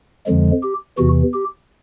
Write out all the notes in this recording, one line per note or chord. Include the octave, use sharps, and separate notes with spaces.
F2 D3 F3 G#3
G4
E2 C3 E3 F#4
G4